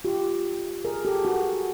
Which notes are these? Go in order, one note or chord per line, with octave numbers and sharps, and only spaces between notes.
F4 G4
G#4 A#4
G4 A4
F#4 G#4